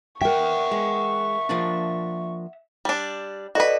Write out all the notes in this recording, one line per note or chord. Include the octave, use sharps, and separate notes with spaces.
A#4 E5 F#5 G5 C#6
G#3
F3 A#3 D4
G3 D4
F#4 A4 B4 D5 D#5